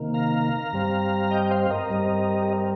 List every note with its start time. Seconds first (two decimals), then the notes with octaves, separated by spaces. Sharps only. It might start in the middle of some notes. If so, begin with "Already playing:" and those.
Already playing: C3 D#3 A#3
0.14 F5 A#5
0.73 G2 G3 C4
1.31 D#5 G5
1.51 C5 F5
1.71 A#4 D#5
1.90 G2 G3 C4
2.42 G4
2.49 A#4